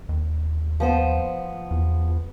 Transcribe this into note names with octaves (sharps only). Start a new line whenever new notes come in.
D#2
F3 B3 C5
E2